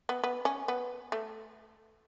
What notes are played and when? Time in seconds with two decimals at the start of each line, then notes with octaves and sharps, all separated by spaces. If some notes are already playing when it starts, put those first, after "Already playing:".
0.09 B3
0.24 B3
0.45 C#4
0.68 B3
1.12 A3